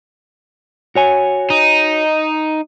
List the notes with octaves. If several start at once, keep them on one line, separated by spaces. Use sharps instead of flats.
F#4 C#5 G#5
D#4